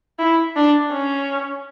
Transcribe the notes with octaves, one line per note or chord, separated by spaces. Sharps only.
E4
D4
C#4